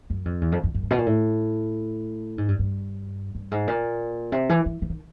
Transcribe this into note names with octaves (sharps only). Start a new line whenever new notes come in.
F#2
F2
E2
F2
F2
F#2
G2
B2
A#2
A2
G#2
G2
G2
G2
G#2
A#2
C3
E3
E3
E3
D#3